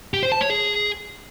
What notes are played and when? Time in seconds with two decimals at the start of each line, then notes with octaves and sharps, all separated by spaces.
0.14 G4
0.23 C5
0.32 A5
0.41 C#5
0.50 G#4